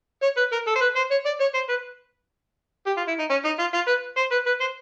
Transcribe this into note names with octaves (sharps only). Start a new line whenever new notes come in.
C#5
B4
A#4
A4
C5
B4
C5
C#5
D5
C#5
C5
B4
G4
F4
E4
D#4
C#4
D#4
F4
F4
B4
C5
B4
B4
C5